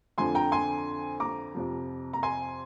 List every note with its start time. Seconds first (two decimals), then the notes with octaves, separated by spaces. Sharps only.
0.18 F2 D3 F3 G#5 C6
0.35 G5 A#5
0.52 G#5 C6
1.20 A#5 D6
1.55 F2 C3 F3
2.13 A#5
2.23 G#5 C6